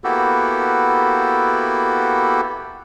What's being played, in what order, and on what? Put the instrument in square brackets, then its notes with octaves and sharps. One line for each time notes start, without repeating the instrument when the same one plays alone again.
[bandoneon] A#3 B3 E4 F#4 G4 A4